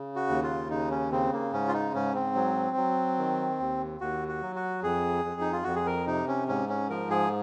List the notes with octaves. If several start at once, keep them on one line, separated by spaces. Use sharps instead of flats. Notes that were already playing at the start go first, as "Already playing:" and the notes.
Already playing: C#3
F#4
D#2
F4
C#3 D#4
C#4
C#3 C4
A#3
G#2 C#4
F4
D#4
G#2 C#4
C4
F#3
F#3
D#3
D#2
D#2 F#4
F#4
F#3
F#4
F2 G#4
F2
D#4
F4
F2 F#4
G#4
A#4
C3 D#4
C#4
G#2 C#4
C#4
F3 A#4
G#4